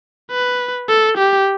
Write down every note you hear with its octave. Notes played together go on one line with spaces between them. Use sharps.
B4
A4
G4